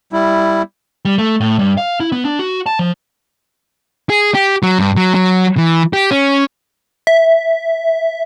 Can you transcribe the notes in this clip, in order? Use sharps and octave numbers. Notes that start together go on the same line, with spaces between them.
G3 E4
G3
A3
A2
G2
F5
E4
B3
D4
F#4
A5
F3
G#4
G4
F#3
G2
F#3
F#3
E3
G4
C#4
E5